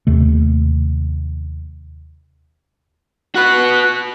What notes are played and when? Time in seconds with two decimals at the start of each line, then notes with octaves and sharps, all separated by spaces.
0.07 D#2 C3 A3
3.35 F#4 B4 F#6